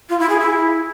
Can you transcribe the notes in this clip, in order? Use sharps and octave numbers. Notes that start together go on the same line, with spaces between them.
F4
E4
G#4
E4